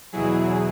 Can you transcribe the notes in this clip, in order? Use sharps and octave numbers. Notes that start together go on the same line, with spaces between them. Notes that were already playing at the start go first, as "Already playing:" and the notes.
E2 B2 F#3 E4 G#4